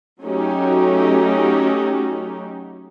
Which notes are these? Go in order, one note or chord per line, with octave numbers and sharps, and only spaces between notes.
F#3 A3 C#4 D#4 F#4 G4